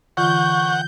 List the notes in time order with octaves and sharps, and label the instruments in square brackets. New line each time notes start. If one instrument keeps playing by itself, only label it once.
[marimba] D3 E3 F4 [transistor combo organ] F#5 [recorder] C#6 [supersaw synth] G6